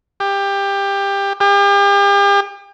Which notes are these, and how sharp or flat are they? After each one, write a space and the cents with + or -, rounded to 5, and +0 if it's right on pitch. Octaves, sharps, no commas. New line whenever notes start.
G4 +20
G4 +40